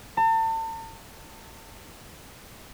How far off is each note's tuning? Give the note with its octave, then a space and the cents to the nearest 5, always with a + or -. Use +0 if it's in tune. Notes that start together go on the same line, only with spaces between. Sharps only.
A5 +40